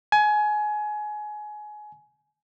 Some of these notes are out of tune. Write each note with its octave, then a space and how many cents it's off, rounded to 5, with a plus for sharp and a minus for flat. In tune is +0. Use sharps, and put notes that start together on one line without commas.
G#5 +25